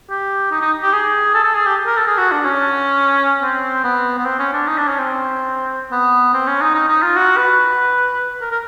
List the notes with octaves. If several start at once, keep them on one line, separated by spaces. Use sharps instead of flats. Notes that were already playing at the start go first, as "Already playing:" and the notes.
G4
D#4
D#4
G4
G#4
A4
A4
G#4
G4
A#4
A4
G#4
F#4
D4
C#4
C4
B3
B3
C4
C#4
D4
D#4
D4
C#4
C4
B3
C4
C#4
D#4
D#4
D#4
F4
F#4
B4
A#4
A#4